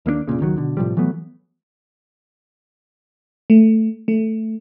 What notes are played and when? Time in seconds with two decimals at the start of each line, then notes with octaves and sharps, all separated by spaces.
0.06 D#2 A#3 B3 D4
0.28 F1 B1 A#2 C#3
0.40 C#2 D#3 F#3
0.56 B2 D3
0.77 A2 C3 F3 G3
0.97 E3 F#3 A3 B3
3.50 A3
4.08 A3